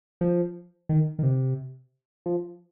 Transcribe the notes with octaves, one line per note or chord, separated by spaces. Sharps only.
F3
D#3
D#3
C3
F3